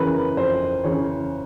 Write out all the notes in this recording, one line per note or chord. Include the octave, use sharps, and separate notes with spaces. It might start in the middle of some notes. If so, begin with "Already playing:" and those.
Already playing: F2 C#3 E3 A#4 B4
F2 C5
C#3 E3 C#5